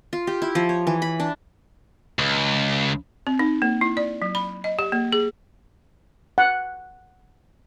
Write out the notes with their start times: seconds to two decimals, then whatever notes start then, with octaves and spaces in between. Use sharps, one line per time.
0.13 F4
0.27 G4
0.42 E4
0.55 F3
0.69 C#5
0.87 E3
1.02 B5
1.20 D4
2.19 C#2
3.27 C4
3.39 D#4
3.62 A#3
3.81 E4
3.97 D5
4.22 F#3
4.35 B5
4.64 D#5
4.79 G4
4.92 A#3
5.13 G#4
6.38 F#5